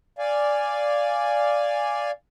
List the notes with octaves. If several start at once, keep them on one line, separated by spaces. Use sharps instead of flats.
D5 F5 G#5